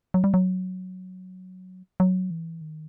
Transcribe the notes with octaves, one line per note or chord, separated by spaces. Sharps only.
F#3
G3
F#3
F#3
E3
D#3